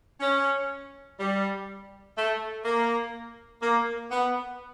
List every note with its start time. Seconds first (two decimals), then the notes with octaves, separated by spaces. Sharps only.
0.20 C#4
1.18 G3
2.15 A3
2.64 A#3
3.61 A#3
4.11 B3